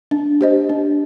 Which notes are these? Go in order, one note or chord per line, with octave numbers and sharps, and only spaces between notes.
D4
G4 C5 D#5
D4